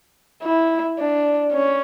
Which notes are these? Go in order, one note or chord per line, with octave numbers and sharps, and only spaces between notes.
E4
D4
C#4